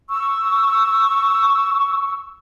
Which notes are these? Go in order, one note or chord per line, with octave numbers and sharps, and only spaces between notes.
C#6 E6